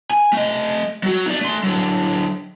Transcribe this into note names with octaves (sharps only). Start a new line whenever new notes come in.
G#5
A3 D#5
F#3 F#4
D#4 D5
A3 C6
D3 F#3